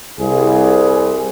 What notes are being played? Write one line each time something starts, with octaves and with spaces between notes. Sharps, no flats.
C2 G#4